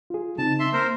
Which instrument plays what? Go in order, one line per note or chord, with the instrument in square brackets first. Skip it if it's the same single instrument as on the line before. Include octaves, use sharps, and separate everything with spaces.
[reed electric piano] F4 G#4
[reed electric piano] C#3 C4 D#4 [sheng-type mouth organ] A5
[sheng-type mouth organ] E5 C6
[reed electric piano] A#3 [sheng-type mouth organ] A#4 C5